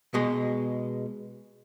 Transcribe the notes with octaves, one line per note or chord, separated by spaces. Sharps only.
B2 G#3